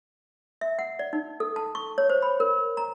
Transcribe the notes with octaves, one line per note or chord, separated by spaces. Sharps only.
E5
F#5
D5
D#4
A4
A5
C#6
C#5
C5
B5
A#4
A#5